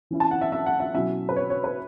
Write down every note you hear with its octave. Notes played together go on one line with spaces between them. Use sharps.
E3 C#4 E4
A5
F#5
E5
E5
F#5
E5
B2 F#3 C#4 E4 E5
B4
C#5
C#5
B4